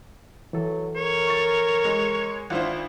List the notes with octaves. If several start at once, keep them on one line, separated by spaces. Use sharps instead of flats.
E3 F#3 A4
A#4 C#5
C#6 A6
G#3
G#1 D4 E4 F4 C5 F#5